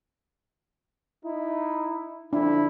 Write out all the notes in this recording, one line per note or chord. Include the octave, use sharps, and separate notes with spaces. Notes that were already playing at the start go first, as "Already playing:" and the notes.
D#4 E4
D3 F3 D4 E4